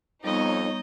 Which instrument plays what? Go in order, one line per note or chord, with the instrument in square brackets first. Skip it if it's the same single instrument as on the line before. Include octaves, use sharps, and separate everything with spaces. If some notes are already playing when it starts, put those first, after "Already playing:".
[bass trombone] F2 [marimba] G3 B3 [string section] D#4 C#5 [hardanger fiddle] D#5